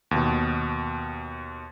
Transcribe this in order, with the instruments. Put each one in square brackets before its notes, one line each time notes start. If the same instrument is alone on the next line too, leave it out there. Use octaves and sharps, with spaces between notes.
[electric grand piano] D#2 B2